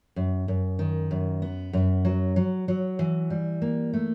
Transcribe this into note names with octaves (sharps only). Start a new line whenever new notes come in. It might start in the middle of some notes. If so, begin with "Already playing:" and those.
F#2
F#2
D#3
F#2
B3
F#2
F#3
F#3
F#3
E3
G3
A#3
A3